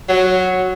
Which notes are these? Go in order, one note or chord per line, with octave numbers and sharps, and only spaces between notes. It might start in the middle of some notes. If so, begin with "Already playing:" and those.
F#3